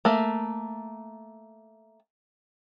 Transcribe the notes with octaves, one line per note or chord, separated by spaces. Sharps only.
A3 A#3